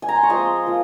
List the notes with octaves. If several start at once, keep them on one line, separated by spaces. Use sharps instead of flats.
G#5
A#5
C6
C#6
F3 G#3 C4 C6 D#6
F3 A#3